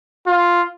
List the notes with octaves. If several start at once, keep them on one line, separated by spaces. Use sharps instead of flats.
F4